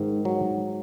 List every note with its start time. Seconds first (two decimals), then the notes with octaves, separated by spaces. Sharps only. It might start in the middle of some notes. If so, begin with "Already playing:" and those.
Already playing: G#2 D#3
0.25 F#3